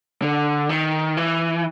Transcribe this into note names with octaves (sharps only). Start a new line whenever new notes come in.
D3
D#3
E3